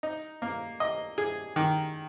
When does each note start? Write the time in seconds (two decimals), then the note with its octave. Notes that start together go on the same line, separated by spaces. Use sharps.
0.03 D#4
0.42 A#3
0.80 D#5
1.18 G#4
1.56 D#3